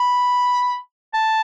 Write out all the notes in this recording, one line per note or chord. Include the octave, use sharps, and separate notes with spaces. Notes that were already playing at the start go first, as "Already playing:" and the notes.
Already playing: B5
A5